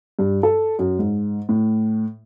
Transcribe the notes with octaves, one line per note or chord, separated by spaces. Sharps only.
G2
A4
F#2
G#2
A2